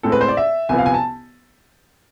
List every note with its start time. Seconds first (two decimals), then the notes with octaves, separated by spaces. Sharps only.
0.03 A2 G#3 C4 A4
0.12 B4
0.21 C5
0.28 D5
0.37 E5
0.69 C2 C3 F3 B3 G#5
0.78 F5
0.86 G#5
0.94 A5